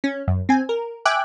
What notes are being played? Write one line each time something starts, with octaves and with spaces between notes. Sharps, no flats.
C#4
F#2
C4 G#5
A#4
E5 G5 G#5 D6 F#6